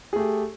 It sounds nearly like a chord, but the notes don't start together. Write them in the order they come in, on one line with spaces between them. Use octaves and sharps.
G#4 A3 G4